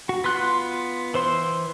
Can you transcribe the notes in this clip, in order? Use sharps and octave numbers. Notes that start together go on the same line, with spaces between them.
F#4
B3 F4 C6 F#6
E3 C5 C6